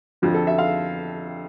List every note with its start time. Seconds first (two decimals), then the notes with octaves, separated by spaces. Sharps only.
0.22 F2 D3 F3
0.34 A4
0.47 E5
0.58 F5